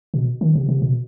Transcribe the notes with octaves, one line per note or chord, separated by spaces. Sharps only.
B2
D#3
C3
C3
B2